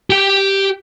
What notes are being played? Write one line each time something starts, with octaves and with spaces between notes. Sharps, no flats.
G4 G5